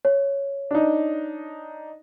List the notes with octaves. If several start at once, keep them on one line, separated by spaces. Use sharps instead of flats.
C#5
D4 D#4